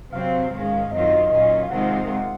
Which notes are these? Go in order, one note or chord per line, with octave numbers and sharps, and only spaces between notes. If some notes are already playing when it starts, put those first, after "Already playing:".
C3 F#3 C4 F5
G#2 D#3 G#3 C#4
F#2 D#3 F#3 C4 F4 D#5
A#2 F#3 C#4 F4
F5
C3 D#3 G#3 C4 F4 F#5